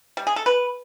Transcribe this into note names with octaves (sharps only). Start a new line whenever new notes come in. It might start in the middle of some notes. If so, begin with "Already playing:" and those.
G3
G#4
A4
B4